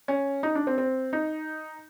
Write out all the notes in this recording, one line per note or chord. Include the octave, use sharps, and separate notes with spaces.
C#4
D#4
D4
C4
C4
D#4